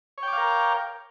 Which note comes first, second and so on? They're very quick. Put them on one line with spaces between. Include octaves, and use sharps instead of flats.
C#5 G5 D6 F5 A#4